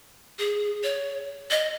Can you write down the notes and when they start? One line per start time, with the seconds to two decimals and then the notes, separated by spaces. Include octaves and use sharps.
0.39 G#4
0.84 C#5
1.51 D#5